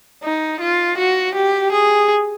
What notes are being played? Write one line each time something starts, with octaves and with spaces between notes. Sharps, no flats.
D#4
F4
F#4
G4
G#4